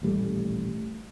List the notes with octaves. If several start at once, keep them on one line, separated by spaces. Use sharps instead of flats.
D#1 A1 G3 A3